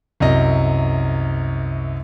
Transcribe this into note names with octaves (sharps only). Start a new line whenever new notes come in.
C2 F#2 D#5